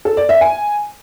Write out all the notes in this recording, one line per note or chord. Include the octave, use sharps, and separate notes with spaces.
A4
D5
E5
G#5